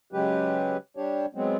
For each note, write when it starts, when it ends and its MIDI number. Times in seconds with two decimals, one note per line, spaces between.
0.13 0.77 49
0.13 0.77 54
0.13 0.77 56
0.13 0.77 67
0.13 0.77 71
0.97 1.26 55
0.97 1.26 62
0.97 1.26 67
0.97 1.26 73
1.35 1.57 54
1.35 1.57 56
1.35 1.57 59
1.35 1.57 60